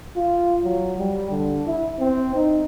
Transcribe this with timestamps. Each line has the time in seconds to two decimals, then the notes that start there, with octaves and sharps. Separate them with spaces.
0.16 F4
0.64 F#3
0.99 G3
1.31 D3
1.66 E4
1.99 C4
2.35 D#4